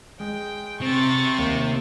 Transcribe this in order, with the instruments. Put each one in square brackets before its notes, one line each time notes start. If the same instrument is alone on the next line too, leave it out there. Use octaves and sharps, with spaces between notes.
[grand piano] G#3 [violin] G5
[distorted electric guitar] C3 [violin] C#6 A6
[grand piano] D#2